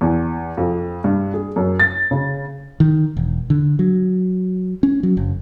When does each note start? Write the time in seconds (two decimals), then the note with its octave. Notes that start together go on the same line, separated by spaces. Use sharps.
0.01 E2
0.57 F2
1.04 G2
1.34 G#4
1.56 F#2
1.80 A6
2.11 C#3
2.80 D#3
3.17 E1
3.50 D3
3.79 F#3
4.83 C#4
5.03 F#3
5.17 F#1